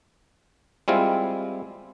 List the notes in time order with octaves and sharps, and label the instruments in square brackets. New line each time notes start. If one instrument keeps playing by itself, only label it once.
[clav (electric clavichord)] G3 G#3 C4 E4 F4